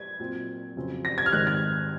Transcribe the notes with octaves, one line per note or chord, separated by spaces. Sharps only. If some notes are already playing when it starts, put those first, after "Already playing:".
Already playing: G#6
A#2 F#3 C4
F2 C#3 F#3 C4
A#6
G#6
F6
G#2 D#3 G#3 C4 F#6
G#6